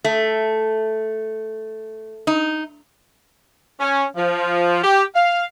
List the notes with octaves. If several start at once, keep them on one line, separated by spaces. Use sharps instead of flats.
A3
D#4
C#4
F3
G4
F5